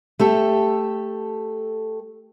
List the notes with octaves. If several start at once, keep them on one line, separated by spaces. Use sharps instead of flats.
A3 G4 A4